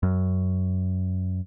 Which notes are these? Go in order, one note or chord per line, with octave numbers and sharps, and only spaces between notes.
F#2